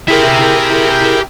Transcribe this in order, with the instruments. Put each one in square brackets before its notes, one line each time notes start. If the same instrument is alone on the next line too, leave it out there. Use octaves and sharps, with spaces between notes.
[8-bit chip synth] E4 G#4 A#4 [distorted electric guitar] G4 E5